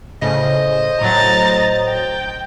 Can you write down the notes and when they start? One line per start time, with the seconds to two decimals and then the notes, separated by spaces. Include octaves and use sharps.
0.22 A2 C#3 C5 D#5
1.01 A2 F#3 A#5 A6
1.89 G5